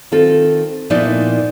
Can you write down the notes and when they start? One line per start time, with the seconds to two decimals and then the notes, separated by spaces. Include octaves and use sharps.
0.12 D#3 C4 F4 A4
0.90 A#2 F3 B3 D#4 E4 D5